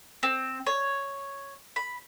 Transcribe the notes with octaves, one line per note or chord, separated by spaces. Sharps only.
C4
C#5
B5